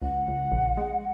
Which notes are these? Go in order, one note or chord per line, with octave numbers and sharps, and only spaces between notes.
C#2 F#5
C#2
A#1
G#3